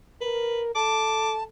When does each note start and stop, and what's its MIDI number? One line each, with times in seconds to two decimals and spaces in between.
0.21 0.75 70
0.21 0.63 71
0.75 1.47 69
0.75 1.43 81
0.75 1.32 86